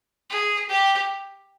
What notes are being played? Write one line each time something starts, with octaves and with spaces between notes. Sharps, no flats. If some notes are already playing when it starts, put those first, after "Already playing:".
G#4
G4